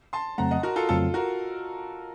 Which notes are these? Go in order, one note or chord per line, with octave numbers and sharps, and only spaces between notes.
A5 C6
F2 C#3 F#3 A3 C4 F#5 A#5
D#5 F#5
F#4 A#4
F4 A4
F2 C#3 F#3 A3 C4 F4 A4
F#4 A#4